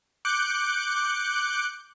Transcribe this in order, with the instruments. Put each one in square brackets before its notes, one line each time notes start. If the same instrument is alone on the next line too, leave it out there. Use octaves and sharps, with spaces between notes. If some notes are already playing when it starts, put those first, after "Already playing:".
[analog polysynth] D6 F#6 G6 C#7 D7